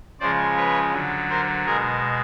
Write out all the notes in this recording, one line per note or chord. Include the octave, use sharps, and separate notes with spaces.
C#3 F3 G#3 C5 D5
B4 C#5
D3 F#3
A#4 C5
B2 G#3 G#4 A#4